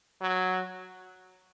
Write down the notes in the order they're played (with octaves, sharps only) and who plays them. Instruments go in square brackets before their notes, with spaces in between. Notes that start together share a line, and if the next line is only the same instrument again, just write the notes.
[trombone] F#3